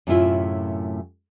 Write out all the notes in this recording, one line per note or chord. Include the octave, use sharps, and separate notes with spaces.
F#2 A2 C3 E4 F4 E5